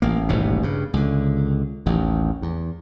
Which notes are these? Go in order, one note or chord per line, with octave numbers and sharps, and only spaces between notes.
A1 A#3
D#1 A1 G#2 B2
G2 C#3
C#2 D3
A1 D#2
E2